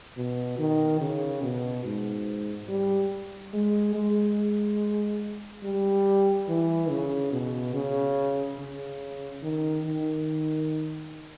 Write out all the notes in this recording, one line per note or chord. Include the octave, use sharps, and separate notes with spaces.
B2
D#3
C#3
B2
G#2
G3
G#3
G#3
G3
E3
C#3
B2
C#3
C#3
D#3
D#3